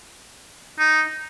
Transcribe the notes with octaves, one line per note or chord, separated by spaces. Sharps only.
D#4